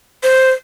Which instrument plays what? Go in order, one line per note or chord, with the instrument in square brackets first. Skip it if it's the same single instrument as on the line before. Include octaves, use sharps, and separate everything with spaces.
[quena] C5